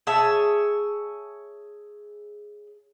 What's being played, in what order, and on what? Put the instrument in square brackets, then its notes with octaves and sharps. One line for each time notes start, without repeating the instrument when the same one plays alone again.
[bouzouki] G#4 C#5 E5 A5